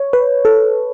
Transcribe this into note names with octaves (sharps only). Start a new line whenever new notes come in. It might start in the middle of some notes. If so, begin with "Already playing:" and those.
Already playing: C#5
B4
A4